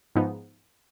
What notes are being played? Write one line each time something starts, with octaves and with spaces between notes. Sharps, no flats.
G#2 F3 B3 D#4